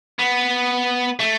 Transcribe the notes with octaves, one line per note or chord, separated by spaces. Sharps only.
B3
A3